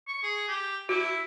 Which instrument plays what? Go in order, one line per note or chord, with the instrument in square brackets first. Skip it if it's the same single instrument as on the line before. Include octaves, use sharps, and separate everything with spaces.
[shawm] C#6
G#4
G4
[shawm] E4 [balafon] F#4